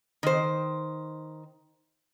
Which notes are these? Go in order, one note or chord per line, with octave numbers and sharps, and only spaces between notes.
D#3 C5